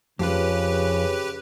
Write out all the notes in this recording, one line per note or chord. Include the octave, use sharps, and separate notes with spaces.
F2 C#3 F4 G4 B4